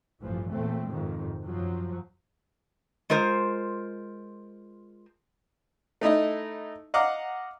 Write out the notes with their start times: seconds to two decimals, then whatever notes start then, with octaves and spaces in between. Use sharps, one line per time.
0.22 A1 G2 E3 F3
0.50 E2 A#2 C#3 A3 C4
0.89 F2 G#2 C3 D#3
1.43 F#2 F3 F#3
3.10 G#3 F4 A#4 C5
6.01 A3 D#4 E4 D#5
6.94 D#5 F5 F#5 A#5 D6 F6